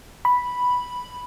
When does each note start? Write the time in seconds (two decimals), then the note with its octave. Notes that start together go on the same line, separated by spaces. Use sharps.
0.25 B5